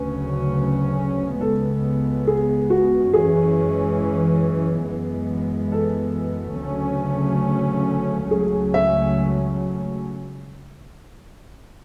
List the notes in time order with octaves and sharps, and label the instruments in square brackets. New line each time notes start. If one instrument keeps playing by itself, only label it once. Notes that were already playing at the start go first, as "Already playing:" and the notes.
Already playing: [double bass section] D2 C#3 F#3 C#4 [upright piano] B4
[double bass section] C#2 C#3 G#3 B3 [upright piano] A4
[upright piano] G#4
F#4
[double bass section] F#2 E3 G#3 C#4 [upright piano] G#4
[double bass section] F#2 E3 G#3 B3
[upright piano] A4
[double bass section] D2 C#3 F#3 A3 C#4
[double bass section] C#2 C#3 F#3 A3 C#4 [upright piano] G#4
[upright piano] E5